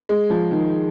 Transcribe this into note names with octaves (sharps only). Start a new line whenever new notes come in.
G#3
F3
D#3